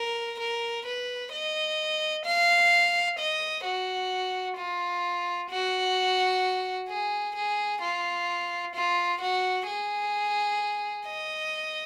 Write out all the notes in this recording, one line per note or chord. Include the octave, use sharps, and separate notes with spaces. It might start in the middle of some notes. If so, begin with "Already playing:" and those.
Already playing: A#4
A#4
B4
D#5
F5
D#5
F#4
F4
F#4
G#4
G#4
F4
F4
F#4
G#4
D#5